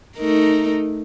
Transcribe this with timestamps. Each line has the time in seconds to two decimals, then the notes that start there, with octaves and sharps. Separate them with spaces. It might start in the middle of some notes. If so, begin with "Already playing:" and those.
0.18 A3 D#4 A#4